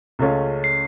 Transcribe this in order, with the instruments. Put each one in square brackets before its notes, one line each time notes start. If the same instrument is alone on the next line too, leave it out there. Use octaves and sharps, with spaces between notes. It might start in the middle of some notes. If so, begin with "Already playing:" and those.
[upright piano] C#2 C#3 A3 C#4 F4
[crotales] C7